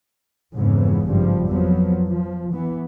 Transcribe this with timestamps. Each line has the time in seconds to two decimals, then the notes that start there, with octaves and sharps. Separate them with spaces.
0.55 F2 G#2 C#3 E3 B3
1.07 G#1 G2 F3 G3
1.48 F2 F3 F#3 B3
2.08 F3
2.53 E3 B3